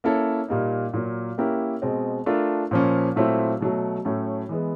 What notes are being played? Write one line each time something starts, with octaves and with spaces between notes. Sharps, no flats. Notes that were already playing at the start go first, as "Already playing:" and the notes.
A#3 C#4 E4 A4 C#5
A#2 G3 A#3 D#4
A#2 F#3 A#3
A#3 C#4 E4 G4 A#4
B2 G#3 C4
A3 D4 F4 A#4
A#2 F3 A#3 C#4
A#2 F#3 A3 C4 E4
B2 F#3 A3
A2 F#3 A3 C#4
E3 G#3 B3